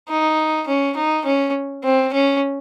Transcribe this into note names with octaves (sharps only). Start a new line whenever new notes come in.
D#4
C#4
D#4
C#4
C4
C#4